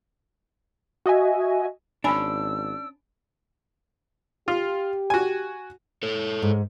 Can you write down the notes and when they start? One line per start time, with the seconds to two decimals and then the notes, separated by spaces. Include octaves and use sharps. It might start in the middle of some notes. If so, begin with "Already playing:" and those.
1.06 F#4 D#5 E5 G#5
2.04 G#1 C#4 D4 G#5 B5 E6
4.48 F4 G4
5.10 F#4 G#5
6.03 A4 C#5
6.42 G#2